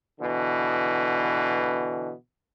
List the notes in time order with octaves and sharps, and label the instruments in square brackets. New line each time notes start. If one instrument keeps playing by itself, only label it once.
[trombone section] B2 D3 E3